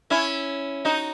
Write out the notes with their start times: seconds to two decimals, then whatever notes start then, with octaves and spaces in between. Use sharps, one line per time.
0.10 C#4 E4
0.85 D#4 F#4